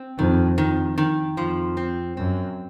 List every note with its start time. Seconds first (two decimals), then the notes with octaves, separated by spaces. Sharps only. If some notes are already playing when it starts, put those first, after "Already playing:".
Already playing: C4
0.18 F2 D#3
0.58 F2 D#3
0.98 D#3
1.37 F2 F3
1.77 C4
2.17 F#2 C4